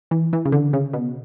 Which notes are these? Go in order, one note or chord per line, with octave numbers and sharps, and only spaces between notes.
E3
E3
C#3
D3
C#3
B2